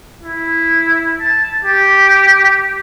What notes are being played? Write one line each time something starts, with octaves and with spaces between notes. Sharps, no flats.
E4
A5
G4